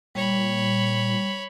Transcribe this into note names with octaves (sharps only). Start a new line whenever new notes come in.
A#2 G3 C#5 B5